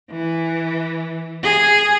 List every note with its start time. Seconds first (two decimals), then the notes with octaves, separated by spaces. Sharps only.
0.11 E3
1.43 G#4